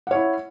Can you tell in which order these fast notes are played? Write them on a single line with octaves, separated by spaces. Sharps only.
F#5 C#5 E4